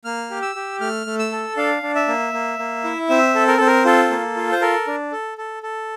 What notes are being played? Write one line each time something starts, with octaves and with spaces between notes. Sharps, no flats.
A#3 F6
G4
E6
G4
A3 F6
A3
E6
A4
D4 F5
D4
E5
A#3
A#3
A#3
E4
C4 E5
A4
A#4
C4 A4
A#4
F4 A4
A#3
F4
C5
A4 A#4
D4
A4
A4
A4